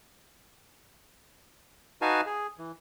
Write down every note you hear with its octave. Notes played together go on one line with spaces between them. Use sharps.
D#4 F#4 B4 F5 G#5 A5
G#4
E3